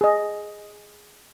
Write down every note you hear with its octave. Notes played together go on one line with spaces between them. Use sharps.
G#4 D#5